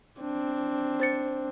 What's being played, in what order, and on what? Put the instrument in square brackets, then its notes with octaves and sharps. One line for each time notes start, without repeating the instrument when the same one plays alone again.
[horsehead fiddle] C4 D4
[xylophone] C5 A6 C#7